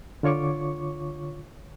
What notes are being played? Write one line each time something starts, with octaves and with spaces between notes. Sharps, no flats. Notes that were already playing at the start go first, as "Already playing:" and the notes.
D3 F4 C#5 C#6 D6